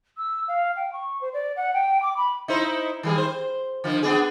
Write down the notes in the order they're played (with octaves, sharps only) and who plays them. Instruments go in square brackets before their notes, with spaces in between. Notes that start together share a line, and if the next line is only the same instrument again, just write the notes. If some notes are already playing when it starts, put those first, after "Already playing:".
[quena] E6
F5
G5
C#6
C5
D5
F#5
G5
D6
B5
[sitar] D#4 E4 C5
D#3 G3 G#4
C5
D3 F3
B3 D4 G#4